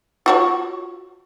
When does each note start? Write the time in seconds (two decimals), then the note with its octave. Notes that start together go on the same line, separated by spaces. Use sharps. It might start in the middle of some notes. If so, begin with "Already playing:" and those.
0.26 F4 F#4 C#5